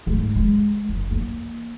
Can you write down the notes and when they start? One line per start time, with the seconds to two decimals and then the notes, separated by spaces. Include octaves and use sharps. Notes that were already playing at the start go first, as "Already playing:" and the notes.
0.06 D2 G#2
0.36 G#3
0.89 F#1
1.11 E3 A#3